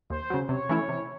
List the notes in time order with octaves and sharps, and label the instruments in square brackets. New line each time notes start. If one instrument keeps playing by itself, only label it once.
[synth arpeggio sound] D#2 [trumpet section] C5
[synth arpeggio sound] C#3 F#3
[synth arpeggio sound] C3 [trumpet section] C#5
[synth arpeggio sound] E3 A3 C#4 E4
C3